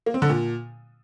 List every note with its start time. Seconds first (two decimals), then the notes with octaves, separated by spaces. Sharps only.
0.06 A#3
0.14 C4
0.22 D3
0.30 A#2